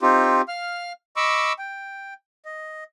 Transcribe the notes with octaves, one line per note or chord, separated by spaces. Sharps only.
C4 D#4 F4 G4
F5 F6
D#5 B5 C#6 D6 E6
G5
D#5